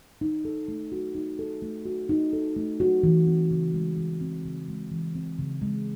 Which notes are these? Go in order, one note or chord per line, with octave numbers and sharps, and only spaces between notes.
D#4
A4
A3
F#4
D#4
A4
A3
F#4
D#4
A4
A3
F#4
E3
C4
C#3
G#3
E3
C4
C#3
G#3
E3
C4
C#3
G#3